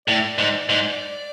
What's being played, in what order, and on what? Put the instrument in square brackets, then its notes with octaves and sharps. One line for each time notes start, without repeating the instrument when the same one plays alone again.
[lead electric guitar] A2 [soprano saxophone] D5
[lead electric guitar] G#2
G#2